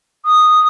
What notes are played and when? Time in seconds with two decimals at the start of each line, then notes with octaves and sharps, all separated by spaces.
0.25 D#6